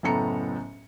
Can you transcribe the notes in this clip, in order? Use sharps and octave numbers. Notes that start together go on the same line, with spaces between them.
F#1 A2 B3 A4 A#5 C#7